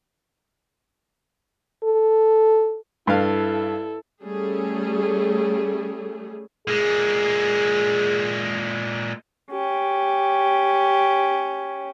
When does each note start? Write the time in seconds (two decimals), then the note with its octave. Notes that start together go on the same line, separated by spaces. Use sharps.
1.84 A4
3.07 G2 E4 A4 F5
4.24 G3 A3 C#4 G#4 A4
6.67 A#2 G#3 G#4
9.51 C#4 G4